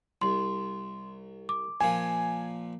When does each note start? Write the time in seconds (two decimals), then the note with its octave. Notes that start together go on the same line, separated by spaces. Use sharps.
0.22 C2 C6
1.49 D6
1.81 A#2 F3 G#5